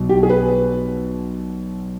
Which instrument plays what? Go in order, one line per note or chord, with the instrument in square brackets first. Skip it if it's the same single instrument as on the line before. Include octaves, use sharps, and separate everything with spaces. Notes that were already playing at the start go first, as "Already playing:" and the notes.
Already playing: [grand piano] B1 B2 G3
G4
G#4
B4